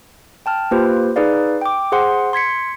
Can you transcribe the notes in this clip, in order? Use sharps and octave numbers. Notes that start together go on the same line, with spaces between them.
G5 A5 F6
A#3 F4 G4 B4 C5
D#4 G#4 B4 D5 F5
G5 D6
G#4 C5 F#5 C6
C6 G#6 B6 C#7